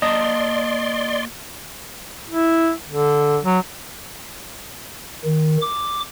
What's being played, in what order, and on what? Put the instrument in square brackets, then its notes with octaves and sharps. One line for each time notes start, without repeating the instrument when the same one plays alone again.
[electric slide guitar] A#3 A5 A#5 [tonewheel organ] D5 C6 [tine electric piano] D#5
[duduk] E4
D3
F#3
[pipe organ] D#3
D6